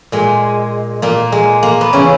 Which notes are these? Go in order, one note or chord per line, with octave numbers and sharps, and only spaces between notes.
A#2 G#3
A#2 A#3
G#3
A#3
B3
C#3 E3 C#4